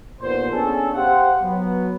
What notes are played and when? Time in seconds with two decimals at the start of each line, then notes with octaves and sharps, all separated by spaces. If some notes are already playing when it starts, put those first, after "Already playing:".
0.21 A#1 D#2 A#2 B3 C5
0.52 B3 C#4 D4 G#4 A4
0.94 G4 C5 F5 F#5
1.41 F#3 B3